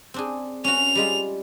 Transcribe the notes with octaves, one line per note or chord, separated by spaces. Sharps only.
C4 D4 G#4
C#4 F#4 F7
G3 G#3 F4